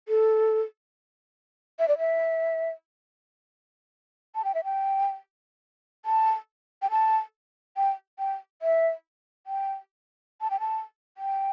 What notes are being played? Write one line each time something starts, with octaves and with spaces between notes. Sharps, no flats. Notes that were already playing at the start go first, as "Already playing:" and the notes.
A4
E5
D5
E5
A5
G5
E5
G5
A5
G5
A5
G5
G5
E5
G5
A5
G5
A5
G5